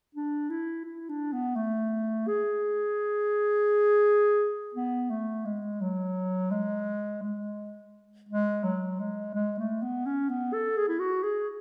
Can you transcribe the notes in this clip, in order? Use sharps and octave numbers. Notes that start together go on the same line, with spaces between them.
D4
E4
E4
D4
B3
A3
G#4
B3
A3
G#3
F#3
G#3
G#3
G#3
F#3
G#3
G#3
A3
B3
C#4
B3
A4
G#4
E4
F#4
G#4